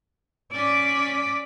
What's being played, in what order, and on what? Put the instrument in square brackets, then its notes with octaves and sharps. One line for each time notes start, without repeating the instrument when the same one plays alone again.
[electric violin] C#4 B6 [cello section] D5